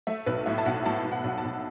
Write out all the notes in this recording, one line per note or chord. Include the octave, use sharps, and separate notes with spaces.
A3 E5
B1 B4
A2 E5
A5
B1 F#5
A2 A5
A2
F#5
B1 F#5
A5
B1